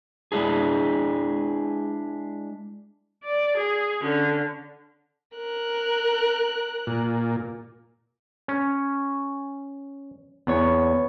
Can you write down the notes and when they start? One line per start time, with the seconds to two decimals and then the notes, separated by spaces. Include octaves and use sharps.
0.32 G#3 D4 E4 G#4
3.24 D5
3.57 G#4
4.02 D3 C#4
5.37 A#4 F#6
6.87 A#2
8.48 C#4
10.47 E2 B3 C#5